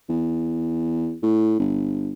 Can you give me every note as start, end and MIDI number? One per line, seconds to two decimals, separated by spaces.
0.09 1.15 40
1.23 1.59 45
1.59 2.13 31